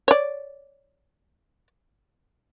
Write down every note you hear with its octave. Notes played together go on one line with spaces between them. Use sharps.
C#5 D5